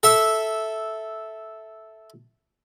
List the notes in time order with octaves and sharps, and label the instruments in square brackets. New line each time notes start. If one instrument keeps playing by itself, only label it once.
[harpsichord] A4 E5